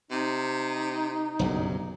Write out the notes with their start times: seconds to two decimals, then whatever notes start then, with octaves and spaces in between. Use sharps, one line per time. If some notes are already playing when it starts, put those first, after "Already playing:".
0.11 C3 D#4
1.39 F#1 B1 G2